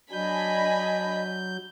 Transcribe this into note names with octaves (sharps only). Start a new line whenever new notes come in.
F#3 D4 D#5 G#5 B5 G6